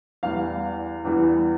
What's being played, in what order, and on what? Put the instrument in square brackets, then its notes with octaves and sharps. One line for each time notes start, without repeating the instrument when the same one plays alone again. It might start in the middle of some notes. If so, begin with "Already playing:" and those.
[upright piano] E2 E3 G3 F5
E2 E3 G3